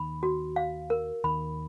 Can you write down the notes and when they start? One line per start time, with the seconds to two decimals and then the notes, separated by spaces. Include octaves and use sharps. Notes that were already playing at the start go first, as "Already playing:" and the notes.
Already playing: D#2 D#3 B5
0.23 F#4
0.56 F5
0.90 A#4
1.24 D#2 D#3 B5